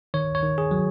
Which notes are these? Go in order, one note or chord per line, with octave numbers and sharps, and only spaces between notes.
D#3 C#5
C#5
D#3
G#4
F#3